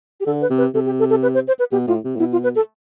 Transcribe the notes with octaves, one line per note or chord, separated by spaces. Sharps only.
G4
D3 A4
B4
C3
B4
C3 A4
G4
A4
A4
B4
C5
C5
B4
B2 G4
A2 F4
C3
A2
B2 E4
F4
B4
A4